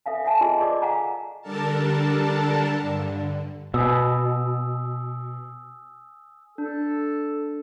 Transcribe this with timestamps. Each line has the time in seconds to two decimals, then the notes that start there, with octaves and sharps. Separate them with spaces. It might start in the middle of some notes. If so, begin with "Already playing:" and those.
0.06 A4 E5 F5 G#5
0.24 E5 F#5 G#5 A5
0.41 F4 G#4 D#5 C6
0.60 G#4 A#4 D5 D#5 C#6 D6
0.82 F5 F#5 G#5 A#5
1.42 D3 G3 D4 A4 A#4 A5
2.79 G2 D3
3.74 B2 G#5 D#6 E6
6.58 D4 A4